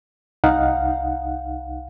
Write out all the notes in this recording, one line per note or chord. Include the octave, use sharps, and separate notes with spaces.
C2 D#4 F5 F#5